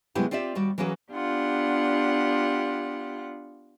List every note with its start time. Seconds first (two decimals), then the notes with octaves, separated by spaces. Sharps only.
0.15 C3 F#3 G#3 B3 E4 G4
0.31 C4 F4 G4 D5 E5
0.55 D#2 G3 F#4 D5
0.78 E3 F#3 A#3 C#4 F#4 G#4
1.12 B3 D4 F4 G4 F#5